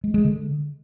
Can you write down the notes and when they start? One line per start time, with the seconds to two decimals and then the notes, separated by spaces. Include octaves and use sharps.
0.04 G#3
0.14 G#3
0.25 D3